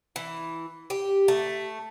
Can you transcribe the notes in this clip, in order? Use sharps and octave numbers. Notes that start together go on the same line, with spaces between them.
E3
G4
A3